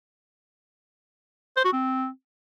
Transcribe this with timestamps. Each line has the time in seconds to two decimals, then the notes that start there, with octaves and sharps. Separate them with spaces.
1.57 C5
1.65 F#4
1.73 C4